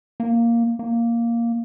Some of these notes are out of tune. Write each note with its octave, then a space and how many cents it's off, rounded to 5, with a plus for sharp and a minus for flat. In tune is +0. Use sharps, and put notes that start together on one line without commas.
A#3 +0
A#3 +0